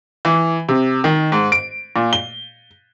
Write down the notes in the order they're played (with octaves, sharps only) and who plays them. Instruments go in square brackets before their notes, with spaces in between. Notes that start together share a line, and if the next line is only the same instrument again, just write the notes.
[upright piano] E3
C3
D#3
G#2
D7
A#2
G7